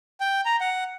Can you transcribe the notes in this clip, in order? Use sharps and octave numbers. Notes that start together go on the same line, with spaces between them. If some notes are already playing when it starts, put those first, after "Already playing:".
G5
A#5
F#5